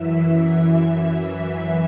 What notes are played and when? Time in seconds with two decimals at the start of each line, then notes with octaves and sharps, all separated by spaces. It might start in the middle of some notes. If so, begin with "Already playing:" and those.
Already playing: F#2 E3 E5
0.37 E5
0.81 E5